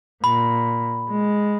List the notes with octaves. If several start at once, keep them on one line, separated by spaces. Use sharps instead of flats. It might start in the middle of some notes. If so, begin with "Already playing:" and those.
A#2 B5
G#3